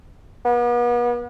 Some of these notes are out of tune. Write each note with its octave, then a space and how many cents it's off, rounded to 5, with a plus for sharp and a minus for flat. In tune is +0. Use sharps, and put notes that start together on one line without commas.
B3 -40